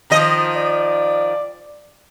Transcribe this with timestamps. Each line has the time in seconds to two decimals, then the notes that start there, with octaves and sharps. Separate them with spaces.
0.10 D#3 F3 D#5
0.56 D5